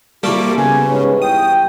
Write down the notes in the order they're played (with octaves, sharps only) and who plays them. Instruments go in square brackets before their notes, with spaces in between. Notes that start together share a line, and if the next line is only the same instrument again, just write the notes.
[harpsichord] C2 F#4 A4 [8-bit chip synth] G3 A#3 D6 [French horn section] G4
[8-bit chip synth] C#3 [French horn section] B3 [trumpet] G#5
[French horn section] G#2 B4 [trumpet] C#4
[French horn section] E2 [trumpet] G5 [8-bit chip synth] D#6